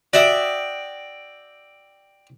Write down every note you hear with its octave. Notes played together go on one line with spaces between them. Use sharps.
F#4 D5 E5 G5 D#6